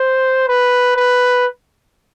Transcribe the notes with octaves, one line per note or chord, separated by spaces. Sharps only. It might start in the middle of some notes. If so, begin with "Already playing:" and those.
Already playing: C5
B4
B4